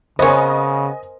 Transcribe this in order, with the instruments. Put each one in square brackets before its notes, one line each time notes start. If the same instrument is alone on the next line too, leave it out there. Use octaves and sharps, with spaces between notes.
[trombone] C#3 [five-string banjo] B3 C#5 [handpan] A#4 C5 [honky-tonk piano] D#5 G#5